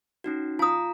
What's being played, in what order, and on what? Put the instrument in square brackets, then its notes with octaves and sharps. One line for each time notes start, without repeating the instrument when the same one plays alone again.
[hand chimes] C#4 D#4 F#4
[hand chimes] F4 A#5 [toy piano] A5 D#6